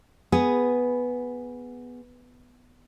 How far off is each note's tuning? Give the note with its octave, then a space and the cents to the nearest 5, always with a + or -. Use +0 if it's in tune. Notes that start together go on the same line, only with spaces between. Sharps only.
B3 +0 G#4 +0